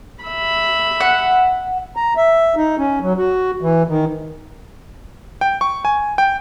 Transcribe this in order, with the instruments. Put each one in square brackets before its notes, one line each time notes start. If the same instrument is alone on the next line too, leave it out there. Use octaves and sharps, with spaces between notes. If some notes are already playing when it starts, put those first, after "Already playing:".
[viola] E5 B5
[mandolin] F#5
[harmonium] A#5
E5
D#4
C#4
F#3
F#4
E3
D#3
[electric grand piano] G5
C#6
G#5
G5